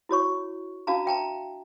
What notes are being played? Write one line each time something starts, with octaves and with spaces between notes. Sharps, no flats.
E4 F#4 C#5 C#6
D4 F#4 F5 A5 A#5
E5 G5 A5 A#5